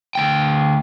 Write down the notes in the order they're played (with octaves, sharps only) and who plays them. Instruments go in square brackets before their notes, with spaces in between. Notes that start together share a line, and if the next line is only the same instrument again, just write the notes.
[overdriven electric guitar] D2 G5